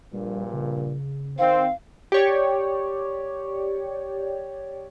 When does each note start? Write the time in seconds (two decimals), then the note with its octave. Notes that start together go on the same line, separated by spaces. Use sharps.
0.13 A#1 G2 A#2 G3
0.53 C#3
1.38 D#3 C4 F5
2.12 G4 C#5 D5